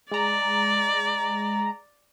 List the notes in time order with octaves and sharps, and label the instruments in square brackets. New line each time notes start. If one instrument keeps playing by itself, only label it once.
[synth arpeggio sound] G#3 A#5 [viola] D5